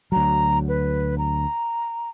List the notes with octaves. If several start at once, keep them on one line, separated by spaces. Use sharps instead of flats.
D2 F#3 A#5
B4
A#5